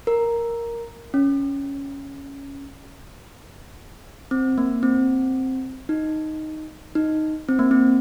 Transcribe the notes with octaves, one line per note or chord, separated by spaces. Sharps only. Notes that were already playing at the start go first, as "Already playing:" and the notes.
A#4
C#4
C4
A#3
C4
D#4
D#4
C4
A#3
C4